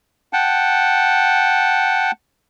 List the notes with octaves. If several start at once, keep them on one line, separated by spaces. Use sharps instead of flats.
F#5 G5 A5